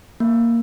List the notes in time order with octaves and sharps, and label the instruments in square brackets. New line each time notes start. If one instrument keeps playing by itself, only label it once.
[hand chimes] A#3